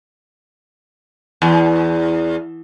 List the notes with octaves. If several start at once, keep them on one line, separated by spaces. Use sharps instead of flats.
E2